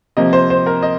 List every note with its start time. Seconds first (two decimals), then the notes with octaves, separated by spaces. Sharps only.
0.17 C3 F3 A#3 D#5
0.33 C5
0.50 C5
0.66 A#4
0.83 D#5